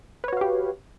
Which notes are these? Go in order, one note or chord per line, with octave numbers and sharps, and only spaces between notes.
F#4 G4 B4 C#5 F5